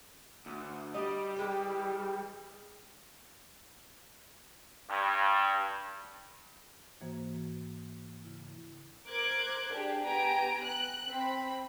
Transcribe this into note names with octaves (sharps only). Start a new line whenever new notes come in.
D2
G3 D#5
E3 G#3 G4
G2
G#2 E3 A#3 F#4 C5
C#3 E4
A#4 C5 D6 F#6 G#6
D4 G4 G#4
B3 G4 G#5 A#5 D7
F#6
C4 B5